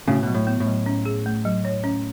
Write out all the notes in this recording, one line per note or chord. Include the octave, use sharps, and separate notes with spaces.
A2 C#3 F#4
B2 F#3
A2
B3
A2
F#3
C#4
G#4
A3
F#3
C#5
C#4